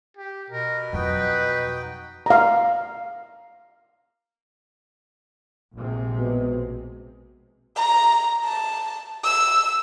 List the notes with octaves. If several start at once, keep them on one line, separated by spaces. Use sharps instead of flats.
G4
B2 A#4
F2 F#3 D#4 F#4 B4 G5
F5 A#5
A#1 C3 G#3
B2
A#5
A5
E6